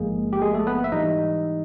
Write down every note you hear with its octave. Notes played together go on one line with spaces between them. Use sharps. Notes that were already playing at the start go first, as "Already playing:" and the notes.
Already playing: A1 G#2 F3 G#3 A#3 G#4
G4
G#3 G#4
A3 A4
B3 B4
E5
G#2 E3 G3 D#4 D#5